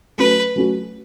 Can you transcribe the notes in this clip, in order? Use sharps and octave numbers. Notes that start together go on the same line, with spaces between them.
F#3 A3 C#4 F#4 B4
F#3 A3 C#4 F#4